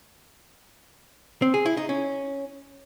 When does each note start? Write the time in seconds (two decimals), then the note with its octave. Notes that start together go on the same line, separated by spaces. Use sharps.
1.42 C4
1.54 G#4
1.66 E4
1.77 D#4
1.89 C#4